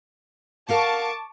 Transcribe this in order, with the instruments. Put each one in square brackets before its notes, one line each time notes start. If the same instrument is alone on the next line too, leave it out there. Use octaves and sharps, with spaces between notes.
[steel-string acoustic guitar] A#4 F5 F#5 [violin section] A5 C#6 D6